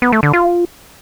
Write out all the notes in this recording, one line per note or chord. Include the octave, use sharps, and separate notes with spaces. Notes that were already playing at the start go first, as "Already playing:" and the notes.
B3
A3
D3
F4